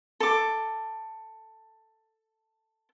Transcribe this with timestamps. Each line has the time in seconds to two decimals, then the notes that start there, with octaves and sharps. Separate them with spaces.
0.20 A4 D6